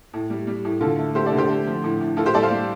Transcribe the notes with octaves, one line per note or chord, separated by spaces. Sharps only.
A2
G3
G3
A2
D3 F4 A4
A3
A3 G4 C5
A4 D5
D3
G4 C5
A3
F3
A2
A2
A2 F4 A4
G4 C5
G3 A4 D5
C5 F5
G3